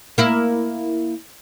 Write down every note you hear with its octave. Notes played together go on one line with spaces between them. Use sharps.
A#3 E4